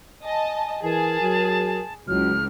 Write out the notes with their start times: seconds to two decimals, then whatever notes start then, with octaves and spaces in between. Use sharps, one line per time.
0.24 D#5 G#5 A5
0.84 E3 G#4 A#4 A5
1.21 F#3
2.08 C#2 F#3 E4 F6